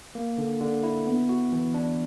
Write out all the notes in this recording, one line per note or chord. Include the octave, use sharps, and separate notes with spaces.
A#3
D3
D3
E4
B3
F#4
E3
D4